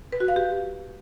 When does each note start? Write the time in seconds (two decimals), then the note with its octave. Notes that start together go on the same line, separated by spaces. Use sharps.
0.12 B4
0.20 F#4
0.28 F5
0.36 G4